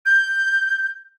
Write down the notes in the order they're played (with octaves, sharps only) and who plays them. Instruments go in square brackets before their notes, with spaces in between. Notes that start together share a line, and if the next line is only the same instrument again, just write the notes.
[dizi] G6